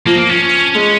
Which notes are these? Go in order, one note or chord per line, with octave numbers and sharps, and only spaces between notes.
F3 A#3
A#3
C#4
G#3